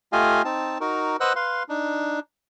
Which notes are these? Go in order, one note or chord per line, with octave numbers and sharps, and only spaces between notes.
A3 F4 G4 D#5 F5 G#5
C4 D#4 A5
D#4 F#4 A#4
B4 C5 D#5 F#5 E6 F#6
B4 F5 C6
D4 D#4